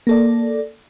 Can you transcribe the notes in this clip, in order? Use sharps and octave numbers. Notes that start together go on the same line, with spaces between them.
A#3 A4 D5